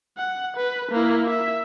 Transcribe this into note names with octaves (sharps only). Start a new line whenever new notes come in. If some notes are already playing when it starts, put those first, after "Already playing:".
F#5
B4
A#3 E4
E5